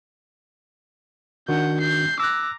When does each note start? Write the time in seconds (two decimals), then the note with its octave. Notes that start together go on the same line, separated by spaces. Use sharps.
1.48 D#3 D4 F#4 F#5 G6
1.80 G6 C7
2.20 A#5 D6 E6 F#6